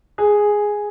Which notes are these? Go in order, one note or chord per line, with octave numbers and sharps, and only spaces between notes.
G#4